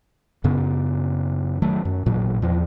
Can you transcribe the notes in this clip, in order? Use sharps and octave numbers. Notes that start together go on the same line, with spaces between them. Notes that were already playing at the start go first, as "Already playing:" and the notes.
F#2 C#3 B3
D#3 F#3 A3
F#2
A1 A#2 F#3
E2 F3